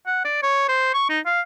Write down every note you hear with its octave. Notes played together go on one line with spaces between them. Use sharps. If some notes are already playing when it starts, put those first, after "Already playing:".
F#5
D5
C#5
C5
C#6
D#4
F5